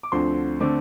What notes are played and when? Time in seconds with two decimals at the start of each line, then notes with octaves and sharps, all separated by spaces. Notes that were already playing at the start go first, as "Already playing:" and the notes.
0.03 D6
0.12 D2 D3 F3 C4 C6
0.60 D3 A3 C4 D6